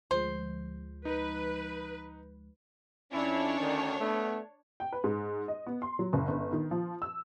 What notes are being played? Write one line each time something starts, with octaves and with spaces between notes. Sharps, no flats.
D2 F3 G#3 C5
D#4 B4
F2 C#4 D4 E4 C#5
D2 D3 D#3
A3 B3
G5
B4
G#2
D#5
B3
C6
F#3
F#1
G1
D#3
F3
E6